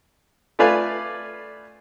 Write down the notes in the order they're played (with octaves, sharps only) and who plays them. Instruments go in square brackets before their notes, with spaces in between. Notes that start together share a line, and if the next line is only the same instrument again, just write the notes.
[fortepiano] A3 F4 B4 D5 F5 G#5